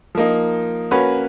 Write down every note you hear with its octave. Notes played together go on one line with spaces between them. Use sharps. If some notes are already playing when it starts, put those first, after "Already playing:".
F3 A#3 D#4
A#3 C#4 F#4 B4